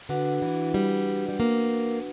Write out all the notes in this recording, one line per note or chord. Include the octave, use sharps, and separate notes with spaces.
D3 D4 F#4 B4 F#5
E3
G3
G3
A#3